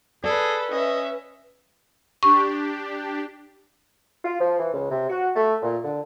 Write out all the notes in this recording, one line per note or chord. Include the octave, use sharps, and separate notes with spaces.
G#4 A4 B4 D5
C#4 B4 D#5 E5
D4 G4 C#6
F4
F3
E3
C#2
C3
F#4
A3
A#2
D3